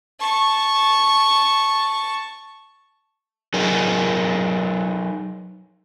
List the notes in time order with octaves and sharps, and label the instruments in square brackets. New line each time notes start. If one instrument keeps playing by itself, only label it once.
[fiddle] A5 C#6
[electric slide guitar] F#3 D#4 G#4 A#4